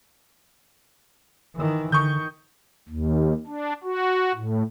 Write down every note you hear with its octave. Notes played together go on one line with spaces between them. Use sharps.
D#3 E3
D3 D#3 C#6 D#6 G6
D#2
D4
F#4
A2